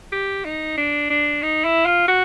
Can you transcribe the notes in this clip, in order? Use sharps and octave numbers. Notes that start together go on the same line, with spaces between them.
G4
D#4
D4
D4
D#4
E4
F4
F#4